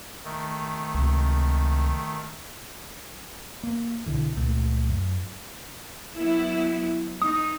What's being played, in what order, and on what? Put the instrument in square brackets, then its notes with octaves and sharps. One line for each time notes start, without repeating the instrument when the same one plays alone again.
[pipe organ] D#3 A3
[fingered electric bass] C#2 C3
[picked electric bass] A#3
B1 D3 E3
C#2 A#2 A3 A#3
F#2
[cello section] F#3 B3 E4
[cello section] D#4 [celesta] D#6